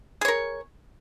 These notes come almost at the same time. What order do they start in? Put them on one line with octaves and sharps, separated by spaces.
G#4 C#5 A#4